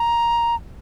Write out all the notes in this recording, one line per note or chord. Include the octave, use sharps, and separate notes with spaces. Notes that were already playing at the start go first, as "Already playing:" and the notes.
Already playing: A#5